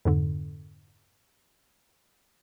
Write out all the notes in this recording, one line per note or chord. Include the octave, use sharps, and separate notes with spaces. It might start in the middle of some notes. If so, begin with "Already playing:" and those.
F2 G#2 D3